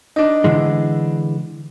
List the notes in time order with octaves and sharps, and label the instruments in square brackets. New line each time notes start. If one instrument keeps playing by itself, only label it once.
[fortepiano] D4 D#4
[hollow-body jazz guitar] D3 E3 G#3